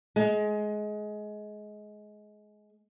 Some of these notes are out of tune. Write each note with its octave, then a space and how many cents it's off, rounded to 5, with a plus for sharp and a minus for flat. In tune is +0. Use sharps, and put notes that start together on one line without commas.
G#3 +20